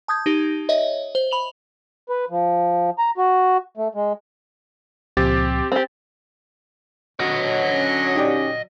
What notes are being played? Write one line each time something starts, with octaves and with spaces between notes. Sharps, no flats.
A5 D#6 G6 G#6
D#4 G4
C#5 D#5 E5
C5
B5 F7 F#7
B4
F3
A#5
F#4
A3
G#3
C#2 A#2 F3 C4 G4 A6
C4 G4
D3 F#3 D#5 F#5
C#4
D#4 G4 D5